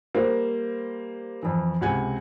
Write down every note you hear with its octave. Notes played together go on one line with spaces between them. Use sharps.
G3 A#3 C5
F2 E3
C#2 C3 F#5 G#5 G#6